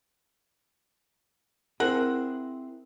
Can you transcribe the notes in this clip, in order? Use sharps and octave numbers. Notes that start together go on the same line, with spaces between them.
C4 E4 G#4 A#4 F#5